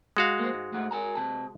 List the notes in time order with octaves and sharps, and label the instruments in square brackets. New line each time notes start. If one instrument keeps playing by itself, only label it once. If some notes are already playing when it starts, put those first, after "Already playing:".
[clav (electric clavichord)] G#3 F#4 F5
[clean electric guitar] A#3 C5
G#2
G#2 A3 F#5
A#4 G#5 A#5
C3 A5